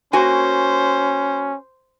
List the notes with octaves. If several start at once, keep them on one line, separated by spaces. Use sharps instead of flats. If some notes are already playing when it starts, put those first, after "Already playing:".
A#3 C#4 F#4 C5 G#5